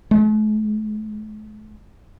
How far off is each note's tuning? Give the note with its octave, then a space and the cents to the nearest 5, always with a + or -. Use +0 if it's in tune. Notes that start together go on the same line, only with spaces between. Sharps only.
A3 -45